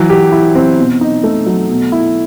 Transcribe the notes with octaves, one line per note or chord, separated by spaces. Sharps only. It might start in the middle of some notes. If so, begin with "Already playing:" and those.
Already playing: E3 F#3
G4
E4
C4
B2
D#4
A3
F#3
B2
E4